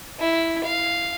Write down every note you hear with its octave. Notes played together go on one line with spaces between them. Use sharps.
E4
F5